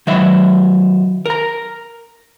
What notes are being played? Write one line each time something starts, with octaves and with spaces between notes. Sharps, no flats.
D#3 F#3 E5
A#4 A#5